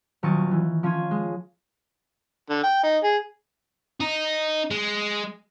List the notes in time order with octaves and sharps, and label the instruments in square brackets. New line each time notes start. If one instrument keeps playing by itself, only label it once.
[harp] D#1 F#3 A#4 C#6 A6 D#7
E3
F3 C#4 C#5 C6 G#6 D#7
G#3
[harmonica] D3
G5
D#4
G#4
[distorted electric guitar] D#4
G#3